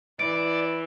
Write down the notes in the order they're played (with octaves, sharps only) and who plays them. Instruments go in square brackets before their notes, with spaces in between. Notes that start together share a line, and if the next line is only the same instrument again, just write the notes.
[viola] E3 [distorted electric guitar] D5 [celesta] D7